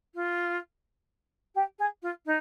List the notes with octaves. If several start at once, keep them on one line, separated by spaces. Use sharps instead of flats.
F4
G4
G#4
F4
D#4